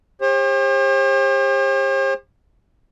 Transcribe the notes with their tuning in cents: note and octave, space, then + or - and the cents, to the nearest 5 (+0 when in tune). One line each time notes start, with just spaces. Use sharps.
G4 +35 C5 +45